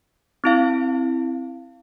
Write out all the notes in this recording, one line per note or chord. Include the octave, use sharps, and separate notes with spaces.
C4 E4 F5